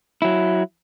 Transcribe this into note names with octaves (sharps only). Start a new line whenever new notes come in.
F#3 E4